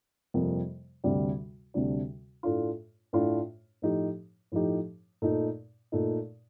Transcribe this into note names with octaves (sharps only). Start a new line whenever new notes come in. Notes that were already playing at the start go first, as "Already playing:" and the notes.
F2 C3 G3 A#3
D2 C3 G3 D4
D2 C3 G3 D4
A2 A3 D4 F4
A2 A3 D4 F4
A2 F3 A3 D#4 G4
A2 F3 A3 D#4 G4
A#2 A3 D#4
A#2 A3 D#4